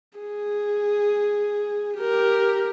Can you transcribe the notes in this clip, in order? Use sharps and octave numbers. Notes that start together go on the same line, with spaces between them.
G#4
G4 A#4